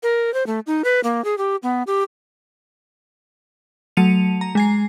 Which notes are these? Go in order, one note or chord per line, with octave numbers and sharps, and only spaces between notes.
A#4
C5
A3
D#4
B4
A#3
G#4
G4
B3
G4
F#3 A3 A5 C#7 D#7 F7
A#5
G#3 G#5 C7